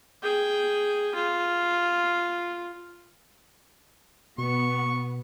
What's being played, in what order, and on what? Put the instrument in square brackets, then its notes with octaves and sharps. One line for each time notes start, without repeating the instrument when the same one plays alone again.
[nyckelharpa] G#4 G5
F4
[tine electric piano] B2 [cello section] B3 [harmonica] C#6